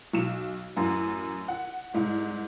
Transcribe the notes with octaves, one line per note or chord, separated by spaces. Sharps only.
B1 E7
A1 F#2
F#5
C2 G#2